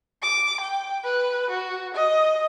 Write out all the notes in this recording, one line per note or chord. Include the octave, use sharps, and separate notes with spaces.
D6
G5
B4
F#4
D#5